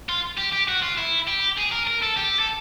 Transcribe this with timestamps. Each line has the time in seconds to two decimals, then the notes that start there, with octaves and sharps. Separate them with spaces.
0.09 F4
0.38 G4
0.53 G4
0.69 F#4
0.83 F4
0.98 E4
1.28 G4
1.58 G#4
1.72 A#4
1.87 A#4
2.02 A4
2.17 G4
2.39 A4